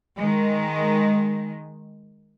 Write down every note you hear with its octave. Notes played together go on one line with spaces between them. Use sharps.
D#3 G#3